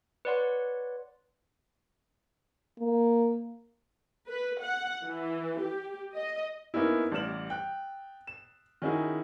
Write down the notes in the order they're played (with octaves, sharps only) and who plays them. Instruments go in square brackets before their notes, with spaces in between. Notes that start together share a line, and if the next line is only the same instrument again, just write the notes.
[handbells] B4 C#5 D5 F#5 C6
[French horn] A#3
[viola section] B4
F#5
E3
G4
D#5
[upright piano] A#3 B3 C#4 D#4 E4
A1 G3 D5 F6 E7 F#7
G5 F#6
E7
D#3 C#4 D#4 E4 F#4 G#4